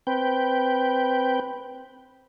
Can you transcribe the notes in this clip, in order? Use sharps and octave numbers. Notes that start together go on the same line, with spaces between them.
C4 B4 G5